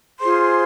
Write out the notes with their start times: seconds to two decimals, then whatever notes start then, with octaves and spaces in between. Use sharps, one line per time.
0.20 F4 G#4 C5 C6